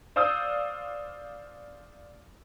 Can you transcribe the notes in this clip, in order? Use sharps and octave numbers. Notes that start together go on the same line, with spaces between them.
C5 D5 F5 D#6 E6 G6